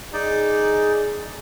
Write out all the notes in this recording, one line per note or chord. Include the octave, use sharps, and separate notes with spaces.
D#4 G#4 D5